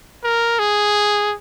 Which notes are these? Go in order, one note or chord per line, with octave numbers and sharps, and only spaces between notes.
A#4
G#4